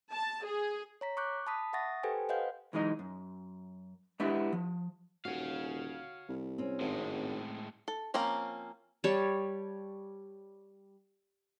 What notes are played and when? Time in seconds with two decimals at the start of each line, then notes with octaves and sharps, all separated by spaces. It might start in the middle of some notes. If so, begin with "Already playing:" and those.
0.11 A5
0.45 G#4
1.01 C#5 A#5 B6
1.17 C#6 D6 F#6 G6
1.47 A5 B5 D#6 B6
1.73 E5 F#5 C#6 D#6 A6 A#6
2.03 G4 A4 B4 C5 G5 G#5
2.29 B4 C5 D#5 F5 F#5 G6
2.73 B1 E3 G#3 D#4 D#5
2.99 F#2
4.20 G#3 B3 D4 E4 G4 E5
4.53 F3
5.25 D#1 F#4 C#5 F5
6.29 C2
6.58 C4 C#4
6.80 G#1 A2 G#3
7.88 A4
8.14 F3 A#3 C4 C#4 A#5
9.04 G3 C#5 A5